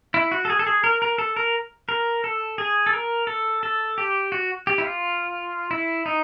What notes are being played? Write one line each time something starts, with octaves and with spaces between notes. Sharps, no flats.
E4
F#4
A4
G#4
A4
G#4
A#4
A#4
A4
A#4
A#4
A4
G#4
A4
A#4
A4
A4
G4
F#4
G4
E4
F4
E4
D#4